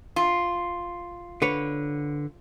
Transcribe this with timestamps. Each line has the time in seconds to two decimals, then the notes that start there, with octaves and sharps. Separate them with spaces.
0.16 F4
1.42 D3 B4 C#5